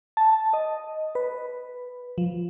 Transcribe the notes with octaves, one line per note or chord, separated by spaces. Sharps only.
A5
D#5
B4
F3